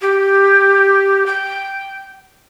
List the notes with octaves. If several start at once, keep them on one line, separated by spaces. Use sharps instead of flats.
G4
G5